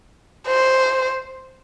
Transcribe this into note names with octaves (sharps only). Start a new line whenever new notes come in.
C5